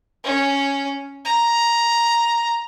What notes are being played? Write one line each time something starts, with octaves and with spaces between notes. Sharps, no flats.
C#4
A#5